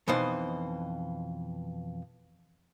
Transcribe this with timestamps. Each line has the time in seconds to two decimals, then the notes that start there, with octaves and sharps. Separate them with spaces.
0.08 F2 B2 E3 D#4 C5